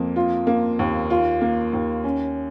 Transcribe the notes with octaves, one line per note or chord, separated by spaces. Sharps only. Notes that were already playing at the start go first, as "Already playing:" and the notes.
Already playing: F2 A#3
F4
A#3
D#2
F4
A#3
D#2
C#4